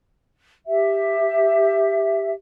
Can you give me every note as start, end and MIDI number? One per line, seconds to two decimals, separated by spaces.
0.66 2.31 67
0.66 2.31 76